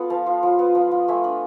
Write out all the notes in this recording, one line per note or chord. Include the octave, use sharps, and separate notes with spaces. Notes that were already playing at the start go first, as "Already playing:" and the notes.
Already playing: B3 F4 A4
F3 F5 A5
F4
F3
B3
F3
F4
A3 E5 G#5
D4